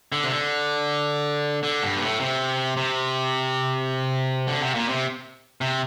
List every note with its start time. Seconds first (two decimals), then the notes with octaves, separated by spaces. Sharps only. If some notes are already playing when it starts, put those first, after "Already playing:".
0.12 D3
0.24 C3
0.30 D3
1.63 D3
1.83 G2
1.96 A#2
2.01 A2
2.20 C3
2.77 C3
4.48 D3
4.61 C3
4.75 A#2
4.89 C3
5.61 C3